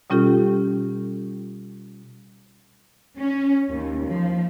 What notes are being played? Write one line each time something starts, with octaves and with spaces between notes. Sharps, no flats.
B2 G3 C#4 F4 G4 A4
C#4
D#2
F3